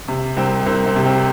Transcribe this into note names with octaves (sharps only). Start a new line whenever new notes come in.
C3
C2 C4
C2 C4
C4
C3
C4